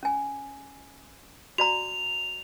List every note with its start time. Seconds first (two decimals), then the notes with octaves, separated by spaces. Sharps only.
0.03 C#4 G#5
1.58 F#4 D5 A#5 F7